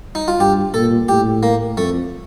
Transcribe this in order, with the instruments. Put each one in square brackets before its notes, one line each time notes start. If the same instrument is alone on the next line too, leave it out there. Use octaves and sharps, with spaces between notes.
[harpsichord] D#4
F4
[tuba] G2 [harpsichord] G4
[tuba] A#2 [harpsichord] A4
[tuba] A2 [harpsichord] G4
[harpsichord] A#3
[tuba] F2 [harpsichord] A3